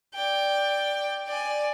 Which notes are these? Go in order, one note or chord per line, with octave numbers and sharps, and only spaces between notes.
D5 G5
D5 G#5